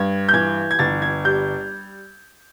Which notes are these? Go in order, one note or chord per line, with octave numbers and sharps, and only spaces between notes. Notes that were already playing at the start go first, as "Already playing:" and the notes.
Already playing: G2 G#6
G6
E3 G#6
G#6
G1 A6
G#6
G3 G6